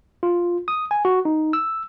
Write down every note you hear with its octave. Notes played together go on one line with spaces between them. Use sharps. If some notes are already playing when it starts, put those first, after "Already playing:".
F4
D#6
G#5
F#4
D#4
E6